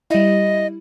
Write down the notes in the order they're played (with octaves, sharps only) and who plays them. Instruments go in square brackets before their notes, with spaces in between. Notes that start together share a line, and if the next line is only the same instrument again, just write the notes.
[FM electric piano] G3 E4 [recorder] D#5